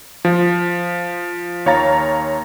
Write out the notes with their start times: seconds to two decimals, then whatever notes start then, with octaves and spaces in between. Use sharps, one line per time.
0.25 F3
1.66 D#2 C#5 F5 A#5 A6